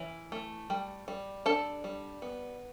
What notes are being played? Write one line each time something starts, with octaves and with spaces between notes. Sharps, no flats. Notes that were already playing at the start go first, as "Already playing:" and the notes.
Already playing: E3 C#4
A3
G3
G3
D4 A4 A5
G3
B3